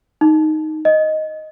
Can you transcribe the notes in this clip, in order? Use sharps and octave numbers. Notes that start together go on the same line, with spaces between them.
D#4
D#5